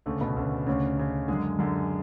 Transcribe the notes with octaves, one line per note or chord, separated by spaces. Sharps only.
D2 C#3 A3
B2 B3
D2 C#3
D2 C#3 C#4
D2 C#3
F#2 D3 G#3 G#4
F#2 D3